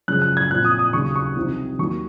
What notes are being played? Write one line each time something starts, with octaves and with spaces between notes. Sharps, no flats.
F#2 C#3 F3 G#3 F#6
F#6
G#6
A#2 F3 C4 F4 F#6
D#6
D#6
D#2 C#3 F#3 C#6
C#6
C2 C3 F3 C4 D#4
D#2 D#3 F#3 A#3 C#6